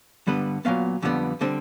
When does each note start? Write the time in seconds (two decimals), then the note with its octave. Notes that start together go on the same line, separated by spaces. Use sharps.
0.27 G2 D3 G3 B3 B4
0.65 A#2 F#3 B3 F5
1.02 F2 D3 G3 B3
1.41 D3 G3 C4